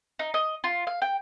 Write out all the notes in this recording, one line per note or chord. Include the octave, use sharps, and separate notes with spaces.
D#4
D#5
F4
F5
G5